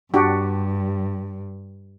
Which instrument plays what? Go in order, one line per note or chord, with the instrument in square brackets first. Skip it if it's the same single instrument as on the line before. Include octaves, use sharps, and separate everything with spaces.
[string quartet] G2 [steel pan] D4 F#4 G4